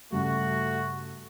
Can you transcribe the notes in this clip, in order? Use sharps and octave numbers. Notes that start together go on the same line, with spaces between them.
G2 C#3 G3 A3 F#4